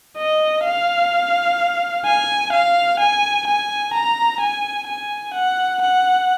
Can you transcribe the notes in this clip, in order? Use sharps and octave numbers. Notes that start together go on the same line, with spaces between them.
D#5
F5
G#5
F5
G#5
G#5
A#5
G#5
G#5
F#5
F#5